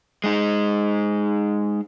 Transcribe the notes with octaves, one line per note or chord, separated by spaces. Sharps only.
G#3 D#4